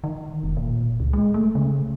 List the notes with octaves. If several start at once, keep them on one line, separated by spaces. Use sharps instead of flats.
D#3
F1
A#2
C#2
G#3
A3
C#3